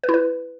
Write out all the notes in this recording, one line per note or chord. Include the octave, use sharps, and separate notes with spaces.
B4
E4
B4